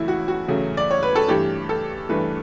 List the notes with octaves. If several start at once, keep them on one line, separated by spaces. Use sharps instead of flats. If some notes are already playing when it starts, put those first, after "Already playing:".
Already playing: E2 C#3 F#3 A3 E4
F#4
F#4
E2 C#3 F#3 A3
D5
C#5
B4
A4
G2 E3 A3 G4
A4
G2 E3 A3 B4